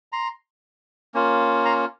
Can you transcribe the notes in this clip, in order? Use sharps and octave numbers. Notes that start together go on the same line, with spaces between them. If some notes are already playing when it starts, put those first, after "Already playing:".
A#5 C6
A#3 C#4 F4
A#5 C6